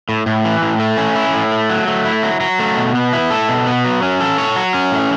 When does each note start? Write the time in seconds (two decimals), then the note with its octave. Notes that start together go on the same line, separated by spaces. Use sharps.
0.09 A2
0.26 A2
0.45 E3
0.62 A2
0.80 A3
0.97 C#4
1.16 E4
1.34 A2
1.52 A3
1.70 F#3
1.87 A3
2.05 E4
2.23 F#3
2.41 F#3
2.59 A3
2.77 B2
2.95 B3
3.13 E4
3.30 A4
3.49 B2
3.67 B3
3.85 F#3
4.03 C#4
4.21 A4
4.38 C#5
4.56 F#3
4.74 C#4
4.92 A2